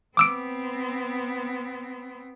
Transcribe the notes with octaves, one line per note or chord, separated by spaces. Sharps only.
B3 C4 D6 E6 D7